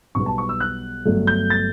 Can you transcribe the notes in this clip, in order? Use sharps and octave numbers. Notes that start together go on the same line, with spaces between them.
B1 B2 G3 B3 C#6
A5
C#6
E6
F#6
G1 G2 F#3 A3
G6
A6